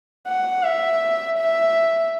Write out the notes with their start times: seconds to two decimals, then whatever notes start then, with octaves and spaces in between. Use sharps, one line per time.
0.27 F#5
0.63 E5
1.38 E5